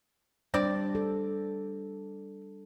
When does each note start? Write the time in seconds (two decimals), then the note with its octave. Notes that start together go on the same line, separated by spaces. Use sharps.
0.54 G3 C4 D4 D5
0.95 A4